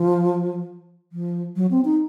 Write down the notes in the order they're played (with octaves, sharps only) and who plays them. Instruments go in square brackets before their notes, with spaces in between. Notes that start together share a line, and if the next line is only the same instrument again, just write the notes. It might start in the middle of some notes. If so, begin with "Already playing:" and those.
Already playing: [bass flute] F3
F3
F#3
C4
D#4